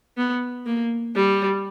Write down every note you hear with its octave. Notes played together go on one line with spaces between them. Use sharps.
B3
A#3
G3